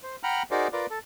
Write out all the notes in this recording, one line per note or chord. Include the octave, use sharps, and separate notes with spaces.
C5
F#5 G5 A#5 B5 F6
D#4 F#4 G#4 A#4 C5 D5
F4 A#4 B4 D5
A4